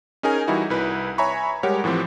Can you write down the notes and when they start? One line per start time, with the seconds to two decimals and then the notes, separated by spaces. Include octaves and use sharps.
0.23 C#4 D#4 G#4 A#4 G#5
0.48 E3 G3 D#4 E4 F#4
0.70 C2 E4 B4
1.18 C#5 E5 G#5 A#5 B5 C#6
1.63 G3 G#3 G4 A#4 C#5 F#5
1.84 A2 E3 F3 C4 G4